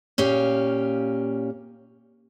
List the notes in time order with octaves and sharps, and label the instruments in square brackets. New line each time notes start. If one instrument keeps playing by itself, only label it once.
[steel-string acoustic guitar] A#2 C#4 G4 F5